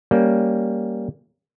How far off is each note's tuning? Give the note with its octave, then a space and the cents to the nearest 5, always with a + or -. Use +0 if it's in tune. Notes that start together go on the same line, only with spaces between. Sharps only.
G3 +0 A#3 +0 C#4 +0